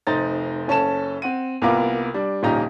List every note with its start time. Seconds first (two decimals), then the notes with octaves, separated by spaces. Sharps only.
0.07 F1 D#4 C5 A#5 A6
0.68 F#1 C#4 A4 A5 E7
1.22 C4 F#5 D#7
1.62 C2 A#3 B3 F4 A#4 D6
2.14 G3 D4
2.43 D#1 A#1 C#3 D#4 G4 A#5